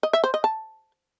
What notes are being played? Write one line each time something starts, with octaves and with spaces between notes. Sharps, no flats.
D#5
E5
C5
D#5
A5